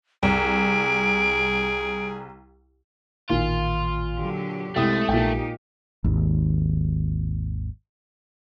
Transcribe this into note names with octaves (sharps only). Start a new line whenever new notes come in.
C2 G#4 D7
A1 A#2 D#3 F4
D3 F#3 G4
C2 C3 G#3 A3 C4 G4 D#6
A#1 A#2 D#4 G4 G5
G#1 D#2